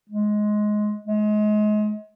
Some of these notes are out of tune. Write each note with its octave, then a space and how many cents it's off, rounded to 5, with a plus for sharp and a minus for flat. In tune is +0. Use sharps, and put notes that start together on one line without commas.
G#3 +15
G#3 +30